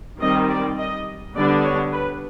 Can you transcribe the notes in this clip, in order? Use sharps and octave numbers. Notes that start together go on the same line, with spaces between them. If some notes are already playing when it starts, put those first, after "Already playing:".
D#3 G3 C4 D#5
D5
D#5
D3 G3 B3 D4 D5
C#5
B4